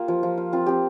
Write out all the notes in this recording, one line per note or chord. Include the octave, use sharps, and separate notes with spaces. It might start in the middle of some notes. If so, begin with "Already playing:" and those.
Already playing: A#3 F4 G4
F3
F3
F4
C4 F4
C4 G4